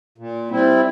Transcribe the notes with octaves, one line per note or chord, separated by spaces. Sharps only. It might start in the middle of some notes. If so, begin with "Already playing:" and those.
A#2
G3 C4 E4